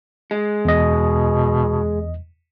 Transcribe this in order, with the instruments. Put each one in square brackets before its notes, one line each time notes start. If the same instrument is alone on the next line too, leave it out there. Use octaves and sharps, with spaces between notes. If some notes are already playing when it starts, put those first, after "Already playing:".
[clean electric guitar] G#3
[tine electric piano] E2 D#5 [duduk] B2